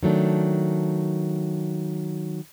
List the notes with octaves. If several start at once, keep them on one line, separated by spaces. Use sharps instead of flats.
D#3 F#3 A3 D4